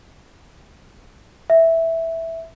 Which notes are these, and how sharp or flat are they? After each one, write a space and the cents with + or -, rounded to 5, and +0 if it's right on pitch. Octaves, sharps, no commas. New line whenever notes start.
E5 -5